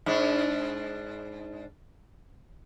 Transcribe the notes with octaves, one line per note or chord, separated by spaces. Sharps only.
G#2 D4